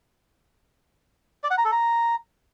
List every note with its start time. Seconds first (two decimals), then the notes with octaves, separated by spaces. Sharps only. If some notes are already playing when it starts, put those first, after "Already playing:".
1.44 D5
1.51 F#5
1.58 A#5
1.65 A4
1.72 A#5